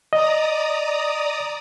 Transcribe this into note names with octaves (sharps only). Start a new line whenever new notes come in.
D5 D#5 A#5 D#6